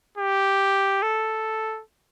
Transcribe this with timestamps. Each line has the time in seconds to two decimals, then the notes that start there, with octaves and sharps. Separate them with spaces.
0.18 G4
1.02 A4